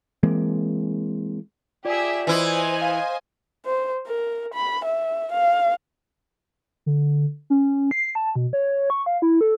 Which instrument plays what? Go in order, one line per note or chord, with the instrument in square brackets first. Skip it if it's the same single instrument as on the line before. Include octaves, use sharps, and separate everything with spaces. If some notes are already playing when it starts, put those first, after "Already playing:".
[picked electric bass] E3 G#3 A#3 C4
[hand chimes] F4 D5 [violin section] G4 G#4 E5
[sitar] E3 E4 [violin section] C5 D#5 G#5
[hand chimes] F5
[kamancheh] C5
A#4
B5
E5
F5
[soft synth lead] D3
C#4
C7
A5
B2
C#5
C#6
F5
E4
A4